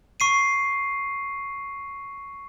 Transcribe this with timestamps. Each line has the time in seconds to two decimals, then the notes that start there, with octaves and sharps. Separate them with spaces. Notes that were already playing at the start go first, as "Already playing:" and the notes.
0.20 C#6 C7 D#7